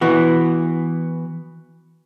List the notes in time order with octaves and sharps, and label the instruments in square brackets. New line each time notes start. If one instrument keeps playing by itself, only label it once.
[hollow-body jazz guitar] E3 B3 F#4